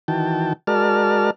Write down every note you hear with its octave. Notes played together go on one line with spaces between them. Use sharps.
D#3 E3 F#4 G5 A5
G#3 F#4 A#4 D5 A5 F6